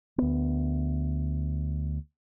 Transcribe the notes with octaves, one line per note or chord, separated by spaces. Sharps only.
D2 B3